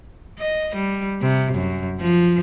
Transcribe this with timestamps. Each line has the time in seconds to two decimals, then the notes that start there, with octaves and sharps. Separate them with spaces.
0.39 D#5
0.76 G3
1.21 C3
1.54 F#2
2.00 F3